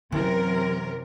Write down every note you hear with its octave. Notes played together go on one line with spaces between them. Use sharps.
F#2 C3 E3 A#4